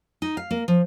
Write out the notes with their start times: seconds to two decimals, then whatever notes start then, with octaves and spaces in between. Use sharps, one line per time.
0.22 D#4
0.37 F5
0.51 A#3
0.68 F3